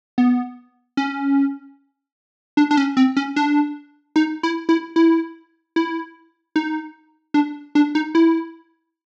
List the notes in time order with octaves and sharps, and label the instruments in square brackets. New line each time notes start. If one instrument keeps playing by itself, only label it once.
[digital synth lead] B3
C#4
D4
D4
C#4
C4
C#4
D4
D#4
E4
E4
E4
E4
D#4
D4
D4
D#4
E4